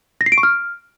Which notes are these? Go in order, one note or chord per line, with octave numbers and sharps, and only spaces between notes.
A#6
C7
D7
C#6
F6